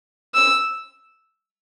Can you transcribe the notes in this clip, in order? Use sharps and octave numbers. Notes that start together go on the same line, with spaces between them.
E6